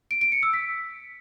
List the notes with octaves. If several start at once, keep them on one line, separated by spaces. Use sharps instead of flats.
D7
D7
C#7
E6
B6